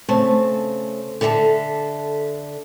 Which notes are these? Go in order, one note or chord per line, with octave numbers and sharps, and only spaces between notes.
C#3 A3 C4 A5
D3 A4 E5 F5 A5